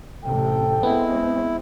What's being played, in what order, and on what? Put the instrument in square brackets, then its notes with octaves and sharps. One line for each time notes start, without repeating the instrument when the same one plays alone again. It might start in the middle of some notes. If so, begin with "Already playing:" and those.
[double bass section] A1 C3 [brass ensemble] A4 G5
[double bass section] G#3 C4 [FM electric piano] B3 [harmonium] E4